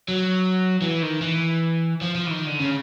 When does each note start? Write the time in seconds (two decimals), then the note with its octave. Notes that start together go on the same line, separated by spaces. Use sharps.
0.08 F#3
0.82 E3
1.03 D#3
1.22 E3
2.01 F3
2.15 F3
2.27 E3
2.30 D#3
2.46 D3
2.60 C#3